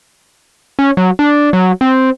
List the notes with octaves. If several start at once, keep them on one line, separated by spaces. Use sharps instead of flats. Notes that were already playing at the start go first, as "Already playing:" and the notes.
C#4
F#3
D4
F#3
C4